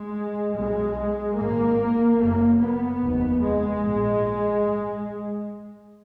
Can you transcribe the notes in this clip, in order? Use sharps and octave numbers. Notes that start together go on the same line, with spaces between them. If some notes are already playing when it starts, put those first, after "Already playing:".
Already playing: G#3
B1 B2 G#3
G#1 G#2 A#3
F#1 F#2 A#3
B3
F1 D#2
G#3
A#1 G#2